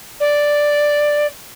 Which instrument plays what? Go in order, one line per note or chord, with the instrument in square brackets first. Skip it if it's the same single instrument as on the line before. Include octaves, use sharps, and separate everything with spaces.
[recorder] D5